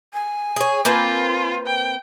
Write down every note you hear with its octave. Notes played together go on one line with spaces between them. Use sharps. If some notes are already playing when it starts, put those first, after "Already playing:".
G#5
G#4 C#5
A#3 C4 F4 B4
G5